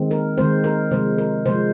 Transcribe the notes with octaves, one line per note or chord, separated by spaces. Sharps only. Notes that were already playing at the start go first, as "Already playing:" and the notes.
Already playing: D#3 G#3 C4
A#4
D#3 G#3 C4 C5
A#4
C3 F3 G#3 C5
A#4
C3 F3 G#3 C5